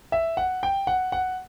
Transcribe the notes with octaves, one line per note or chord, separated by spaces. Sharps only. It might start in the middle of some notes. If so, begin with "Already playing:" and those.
E5
F#5
G5
F#5
F#5